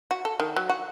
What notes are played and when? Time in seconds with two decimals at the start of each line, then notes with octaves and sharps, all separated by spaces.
0.11 F#4
0.25 A4
0.40 D#3
0.56 F#3
0.69 F#4